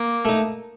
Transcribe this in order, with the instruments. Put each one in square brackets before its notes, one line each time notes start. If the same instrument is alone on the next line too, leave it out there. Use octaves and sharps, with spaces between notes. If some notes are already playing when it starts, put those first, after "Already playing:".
Already playing: [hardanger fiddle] A#3
[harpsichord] A3 D#4